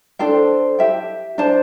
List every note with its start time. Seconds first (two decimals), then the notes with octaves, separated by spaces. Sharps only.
0.19 D4 A4 C5 G5
0.79 G4 E5 G5
1.38 D4 C5 A5